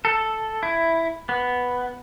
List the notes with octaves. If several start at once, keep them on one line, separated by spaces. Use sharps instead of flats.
A4
E4
B3